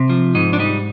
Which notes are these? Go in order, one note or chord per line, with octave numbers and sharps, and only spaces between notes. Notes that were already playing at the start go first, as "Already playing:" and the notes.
Already playing: C3
F3
G#2 D#4
D4
G3 D#4